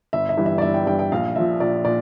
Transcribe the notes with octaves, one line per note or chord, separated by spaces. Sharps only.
G1 E5
E5
G2 E3 G3
E5
D5
G1 E5
G5
G2 E3 G3 G5
G5
A#1 F5
A#2 F3 E5
A#1 D5
A#2 D5